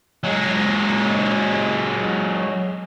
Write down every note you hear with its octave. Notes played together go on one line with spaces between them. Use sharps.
F#3 G#3